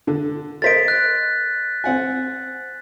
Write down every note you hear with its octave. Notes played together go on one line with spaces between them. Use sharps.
D3
A#4 C5 D#5 A6 B6 D7
F#6
C4 F#5 G#5